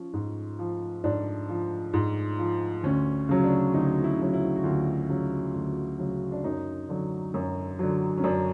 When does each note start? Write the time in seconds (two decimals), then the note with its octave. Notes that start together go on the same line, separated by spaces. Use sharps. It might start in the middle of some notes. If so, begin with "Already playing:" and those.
Already playing: F3 C#4
0.13 G#2
0.59 F3
1.04 G#2 D4
1.49 F3
1.93 G#2
2.39 F3
2.83 D2 C#4
3.29 C#3 F#3
3.44 D4
3.74 D2 D#4
4.04 E4
4.19 C#3 F#3
4.34 E4
4.56 F#4
4.63 D2 F4
5.09 C#3 F#3
5.54 D2
5.99 C#3 F#3
6.32 D4
6.44 F#2 D#4
6.89 D3 F#3
7.34 F#2
7.79 D3 F#3
8.18 C#4
8.24 F#2 D4